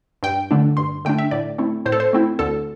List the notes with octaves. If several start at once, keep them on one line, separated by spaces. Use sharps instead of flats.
G2 G5
D3 A3 D4
G2 C6
D3 A3 D4 G5
E5
A2 D5
A3 C4 E4
A2 C5
A4
C5
A3 C4 E4
D2 A4